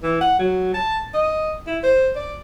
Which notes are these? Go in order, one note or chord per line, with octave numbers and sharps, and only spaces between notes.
E3
F#5
F#3
A5
D#5
E4
C5
D5